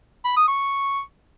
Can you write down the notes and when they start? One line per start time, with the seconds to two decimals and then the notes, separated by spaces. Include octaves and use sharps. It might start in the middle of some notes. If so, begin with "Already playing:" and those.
0.25 B5
0.36 D#6
0.48 C#6